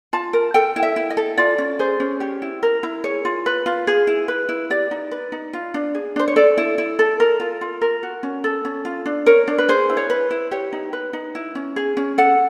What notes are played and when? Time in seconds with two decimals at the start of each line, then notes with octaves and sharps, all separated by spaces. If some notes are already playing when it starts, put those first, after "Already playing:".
0.13 F4 A5
0.33 A#4
0.54 A4 G5
0.76 E4
0.83 E5
0.96 E4
1.10 D#5
1.17 A4
1.38 F4 D5
1.58 C#4
1.79 G#4 C5
2.00 C#4
2.20 G4 C#5
2.42 E4
2.63 A#4
2.83 E4
3.04 G#4 C#5
3.25 F4
3.46 B4
3.66 F4
3.87 G#4
4.07 E4
4.28 B4
4.49 E4
4.70 G4 D5
4.91 D#4
5.11 B4
5.32 D#4
5.53 F4
5.74 D4
5.95 G#4
6.16 D4 C5
6.28 C#5
6.36 A4 D5
6.58 E4
6.78 E4
6.99 A4
7.20 A#4
7.40 F4
7.61 F4
7.81 A#4
8.03 F#4
8.23 C#4
8.44 A4
8.65 C#4
8.85 F4
9.06 D4
9.26 A#4 C#5
9.48 D4
9.58 B4
9.69 G#4 C5
9.90 E4
9.97 C#5
10.10 B4
10.31 E4
10.51 G4 C#5
10.73 D#4
10.93 B4
11.13 D#4
11.35 E4
11.55 C#4
11.76 G#4
11.97 C#4
12.18 A4 F#5